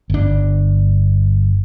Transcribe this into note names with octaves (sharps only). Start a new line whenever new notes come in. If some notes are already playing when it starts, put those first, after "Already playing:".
G1 D4